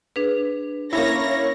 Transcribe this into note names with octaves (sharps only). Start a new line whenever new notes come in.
D4 G#4 B4
A#3 C#4 E4 C#5 A#6